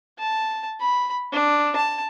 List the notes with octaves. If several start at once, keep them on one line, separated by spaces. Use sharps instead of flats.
A5
B5
D4
A5